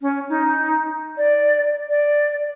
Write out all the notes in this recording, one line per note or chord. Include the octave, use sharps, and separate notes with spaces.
C#4
D#4
D5
D5